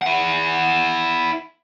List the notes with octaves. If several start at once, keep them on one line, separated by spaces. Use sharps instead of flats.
E4 F#5